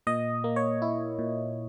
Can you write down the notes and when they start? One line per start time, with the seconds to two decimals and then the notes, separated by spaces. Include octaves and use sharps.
0.07 A#2 D#5
0.44 A#3
0.56 C#5
0.82 E4
1.19 A#2